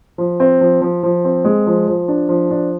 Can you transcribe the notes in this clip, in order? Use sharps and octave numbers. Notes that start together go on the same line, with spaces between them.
F3
C4
F3
F3
F3
C4
G#3
F3
F3
D4
F3
D4